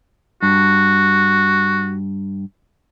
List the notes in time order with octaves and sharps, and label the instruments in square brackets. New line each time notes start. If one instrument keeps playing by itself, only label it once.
[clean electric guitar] G2 [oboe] F#4